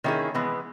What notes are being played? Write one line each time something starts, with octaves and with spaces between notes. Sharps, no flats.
D#3 A#3 C#4 E4 G#4
E3 G#3 B3